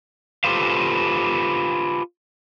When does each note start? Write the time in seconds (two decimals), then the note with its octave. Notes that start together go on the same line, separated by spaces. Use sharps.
0.44 F4 G4 A4 B4 C5 F5